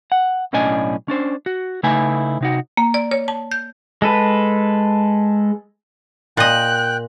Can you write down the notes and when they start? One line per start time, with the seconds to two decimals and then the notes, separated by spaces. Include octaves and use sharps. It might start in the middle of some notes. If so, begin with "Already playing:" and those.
0.12 F#5
0.53 B1 A2 C#4 D4 D#5 G#5
1.08 C#4 D4 C5
1.46 F#4
1.83 C#3 A3 D#4 E4 B4 G#5
2.41 C3 D#4 F#4
2.77 A#3
2.94 D5
3.11 C#5
3.28 A5
3.51 G6
4.02 G#3 A4 B4
6.37 A#2 D#5 G5 F#6